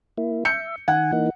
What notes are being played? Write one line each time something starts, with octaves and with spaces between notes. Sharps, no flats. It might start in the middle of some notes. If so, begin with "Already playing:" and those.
A#3 E4
E5 G6 C#7
D#3 F#5 G#5
E3 A#3 D#4